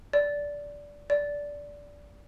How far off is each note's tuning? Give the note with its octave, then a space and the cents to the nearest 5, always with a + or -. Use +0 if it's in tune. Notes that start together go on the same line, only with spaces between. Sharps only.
D5 -15
D5 -15